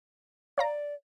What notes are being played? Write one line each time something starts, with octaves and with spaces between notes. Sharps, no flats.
C#5 D5 F5 A#5